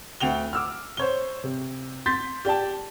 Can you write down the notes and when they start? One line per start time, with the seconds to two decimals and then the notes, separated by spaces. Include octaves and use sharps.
0.20 D2 G5 F7 G7
0.53 D6 E6 F6
0.97 C5 C#5 G7
1.44 C3
2.06 C6 G6 A6 B6
2.45 G4 D5 G5 A5